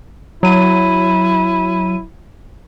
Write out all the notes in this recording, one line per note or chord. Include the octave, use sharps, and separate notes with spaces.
F#3 E4 D#7